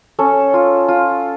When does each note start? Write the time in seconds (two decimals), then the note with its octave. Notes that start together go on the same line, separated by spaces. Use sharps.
0.19 C#4 A4
0.54 F4
0.88 F4